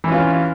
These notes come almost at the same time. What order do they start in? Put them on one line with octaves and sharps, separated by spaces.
E3 C#4 F4